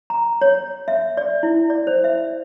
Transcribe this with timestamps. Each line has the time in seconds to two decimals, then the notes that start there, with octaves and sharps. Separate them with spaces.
0.10 A#5
0.41 C#5
0.88 E5
1.17 D5
1.43 E4
1.70 D5
1.87 C5
2.04 E5